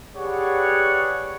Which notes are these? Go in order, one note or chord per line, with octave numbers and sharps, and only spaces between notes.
G4 G#4 B4 C#5 D5 F#5